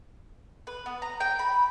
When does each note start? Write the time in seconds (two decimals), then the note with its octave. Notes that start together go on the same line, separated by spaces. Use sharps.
0.67 B4
0.86 B3
1.02 A#5
1.20 G5
1.39 B5